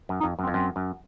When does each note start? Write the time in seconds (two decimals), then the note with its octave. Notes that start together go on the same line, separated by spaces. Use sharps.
0.09 F#2
0.20 D#4
0.23 F2
0.39 F#2 C4
0.48 F2
0.53 F#2 C4
0.76 F#2